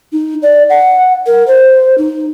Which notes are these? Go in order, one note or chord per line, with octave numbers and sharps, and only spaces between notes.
D#4
D5
F#5
A#4
C5
D#4